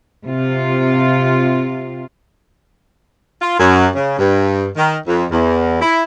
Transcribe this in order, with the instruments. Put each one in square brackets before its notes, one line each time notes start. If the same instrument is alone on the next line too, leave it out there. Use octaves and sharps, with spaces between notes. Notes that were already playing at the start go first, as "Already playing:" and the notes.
[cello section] C3 F4
[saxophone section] F4
F#2
C#3
G2
D#3
F2
E2
E4